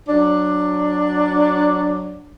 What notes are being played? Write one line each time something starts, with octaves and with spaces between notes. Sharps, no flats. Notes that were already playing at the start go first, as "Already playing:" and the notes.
F#3 D4